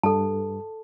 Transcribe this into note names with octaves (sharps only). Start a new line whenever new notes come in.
G2 A4 A5